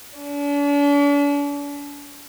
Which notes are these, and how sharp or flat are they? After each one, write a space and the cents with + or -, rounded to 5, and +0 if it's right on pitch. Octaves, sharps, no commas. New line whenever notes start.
D4 -40